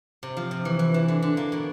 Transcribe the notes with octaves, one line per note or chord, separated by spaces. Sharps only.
C3
F3
C3
E3
E3
E3
D3
D3
A#3
B2